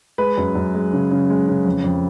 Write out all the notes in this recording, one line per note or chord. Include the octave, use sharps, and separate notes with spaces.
G#3 B4
F#2
F#2
G#3
C#3
C#3
G#3
C#3
F2
F2